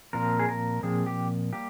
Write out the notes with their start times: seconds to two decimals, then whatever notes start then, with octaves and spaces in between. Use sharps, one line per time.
0.13 A#2 F3 C4 A#4
0.39 G#4
0.49 A#4
0.83 A#2 F3 C4 G#4
1.06 G4
1.53 G3 A#3 G4